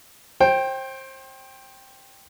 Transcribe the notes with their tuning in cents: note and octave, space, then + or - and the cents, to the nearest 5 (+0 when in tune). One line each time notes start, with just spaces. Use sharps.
C5 +30 G5 +0